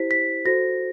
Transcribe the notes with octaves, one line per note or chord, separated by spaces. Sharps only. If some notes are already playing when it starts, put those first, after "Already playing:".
Already playing: E4 G4 C5 B6
B6
F#4 A4 C5 A#6